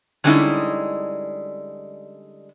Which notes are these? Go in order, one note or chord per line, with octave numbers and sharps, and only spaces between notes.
D3 G3 G#3 C#4 D#4 E4